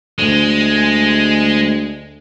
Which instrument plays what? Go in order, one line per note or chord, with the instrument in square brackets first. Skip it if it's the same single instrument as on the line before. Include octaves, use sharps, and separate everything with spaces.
[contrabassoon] D2 [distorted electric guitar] G#3